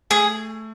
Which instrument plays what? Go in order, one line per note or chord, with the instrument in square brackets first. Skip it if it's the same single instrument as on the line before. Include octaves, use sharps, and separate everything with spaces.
[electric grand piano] A3 [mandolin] G#4